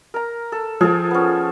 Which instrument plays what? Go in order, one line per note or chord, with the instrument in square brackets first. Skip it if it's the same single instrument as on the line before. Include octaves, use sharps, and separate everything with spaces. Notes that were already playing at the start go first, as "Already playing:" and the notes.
[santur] A#4 A#5
A4
[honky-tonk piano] F3 [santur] G#4 A4 G5
[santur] B3 C#4